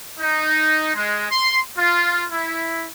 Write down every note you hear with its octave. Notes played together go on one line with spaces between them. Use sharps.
D#4
G#3
C6
F4
E4